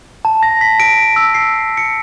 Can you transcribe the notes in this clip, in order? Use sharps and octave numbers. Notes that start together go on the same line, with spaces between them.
A5
A#6
B6
D7
E6
C7
C#7